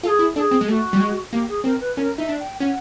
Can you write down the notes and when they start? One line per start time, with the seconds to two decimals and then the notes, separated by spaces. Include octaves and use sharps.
0.03 F4 A4
0.08 G#4
0.19 E4
0.35 D4 A4
0.40 G#4
0.51 C4
0.61 G#3
0.68 A3 G4
0.72 F#4
0.93 G3
1.00 G#3
1.32 A#3 G4
1.49 G#4
1.64 C4 A#4
1.81 B4
1.96 C#4 A#4
2.18 D#4 E5
2.29 D4
2.40 G5
2.60 C#4 F#5